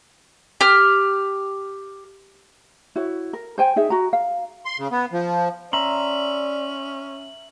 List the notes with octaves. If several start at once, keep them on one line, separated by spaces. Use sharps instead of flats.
G4 F6
E4 F#4 C#5
A#4
C5 G5 G#5
D#4 G#4 E5
F#4 A#5
F5
C6
C#3
B3
F3
C#4 D5 E5 A#5 C6 F#7